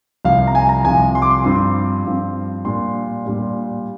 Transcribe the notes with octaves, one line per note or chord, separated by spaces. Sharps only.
C2 C3 F3 F5
A#5
G#5
A#5
C2 C3 F3 G#5
C6
D6
C6
G2 F3 C4 C6
G2 F3 C4
A#2 G3 D4 C6
A#2 G3 D4